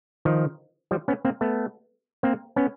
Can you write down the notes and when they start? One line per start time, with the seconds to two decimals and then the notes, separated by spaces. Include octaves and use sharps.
0.25 D#3 F3
0.91 F3 G3
1.08 B3 C#4
1.25 A#3 C4
1.41 A3 B3
2.23 A#3 C4
2.56 B3 C#4